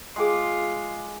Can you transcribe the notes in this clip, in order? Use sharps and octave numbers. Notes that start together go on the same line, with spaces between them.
G#3 F4 G#4 G5 C6 D6